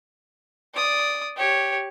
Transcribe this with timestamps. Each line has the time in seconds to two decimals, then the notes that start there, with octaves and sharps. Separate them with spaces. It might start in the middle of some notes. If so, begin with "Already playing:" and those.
0.74 D5 D#6
1.37 G4 C#5